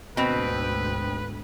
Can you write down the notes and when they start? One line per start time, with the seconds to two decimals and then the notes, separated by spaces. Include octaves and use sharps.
0.17 D2 G#2 B2 C4 B4